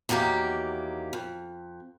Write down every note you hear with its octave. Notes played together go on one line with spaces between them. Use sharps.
E2 D#3 F#3 A#3 G4
F2